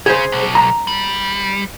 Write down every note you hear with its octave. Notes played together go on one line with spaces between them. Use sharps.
C#3 G#4 C5
B1
A#5
G3